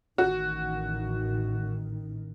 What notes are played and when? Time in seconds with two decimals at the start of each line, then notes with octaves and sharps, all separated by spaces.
0.18 A1 D#3 F#4